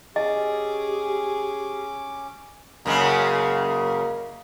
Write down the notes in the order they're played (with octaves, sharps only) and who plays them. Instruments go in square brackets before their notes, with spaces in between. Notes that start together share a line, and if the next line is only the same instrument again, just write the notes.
[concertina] C#4 D6 [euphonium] G4 [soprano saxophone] G#4 [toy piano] D#5
[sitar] F#2 C#3 G#3 [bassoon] A#3